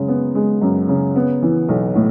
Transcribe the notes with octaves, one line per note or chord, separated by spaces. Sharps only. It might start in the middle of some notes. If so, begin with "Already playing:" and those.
Already playing: F#2 C#3 G#3
B3
G#3
F#2
C#3
B3
E3
B1
A2